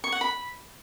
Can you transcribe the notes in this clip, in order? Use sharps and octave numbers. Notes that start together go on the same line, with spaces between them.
C#6
F#5
B5